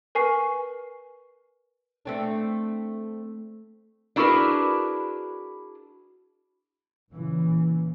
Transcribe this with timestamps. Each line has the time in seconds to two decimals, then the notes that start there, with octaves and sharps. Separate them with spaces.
0.15 A#4 B4 G#5 C#6 C7
2.05 A3 C4 D4
4.16 D4 E4 F#4 G#4 A#4 B4
7.12 A#2 C#3 E3